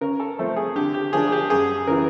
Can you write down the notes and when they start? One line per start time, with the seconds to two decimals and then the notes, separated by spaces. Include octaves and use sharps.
0.01 C#3 A#4
0.20 A4
0.39 F3 A3 C4 A4
0.56 G#4
0.76 D3 G4
0.94 G4
1.13 F3 A#3 D4 G#4
1.27 G#4
1.32 G4
1.50 F#2 G#4
1.87 C#3 E3 A#4